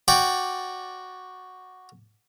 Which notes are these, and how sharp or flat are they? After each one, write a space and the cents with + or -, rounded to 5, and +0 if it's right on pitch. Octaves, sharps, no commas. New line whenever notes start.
F#4 +0 D5 +0 G5 +0